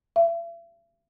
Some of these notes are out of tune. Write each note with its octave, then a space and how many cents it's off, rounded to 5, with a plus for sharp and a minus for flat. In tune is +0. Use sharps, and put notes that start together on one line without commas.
E5 +45